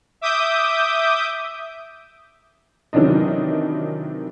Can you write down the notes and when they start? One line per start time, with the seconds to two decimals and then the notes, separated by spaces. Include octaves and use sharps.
0.21 E5 D6 D#6 G6
2.93 C3 D#3 E3 F#3 D4 D#5